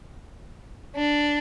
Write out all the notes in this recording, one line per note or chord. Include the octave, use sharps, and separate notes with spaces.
D4